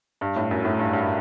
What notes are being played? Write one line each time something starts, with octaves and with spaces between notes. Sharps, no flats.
G2
A2
F#2
A2
G2
G2